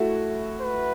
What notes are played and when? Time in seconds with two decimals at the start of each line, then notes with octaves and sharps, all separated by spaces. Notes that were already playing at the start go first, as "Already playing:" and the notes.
Already playing: A3 E4 F#4
0.61 B4